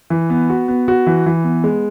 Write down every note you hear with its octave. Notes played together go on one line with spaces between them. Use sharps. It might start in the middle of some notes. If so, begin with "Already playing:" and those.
E3
B3
F#4
B3
F#4
E3
E3
B3
G#3